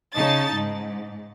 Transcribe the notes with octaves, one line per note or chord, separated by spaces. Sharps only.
C#3 D#4 A5 A6
G#2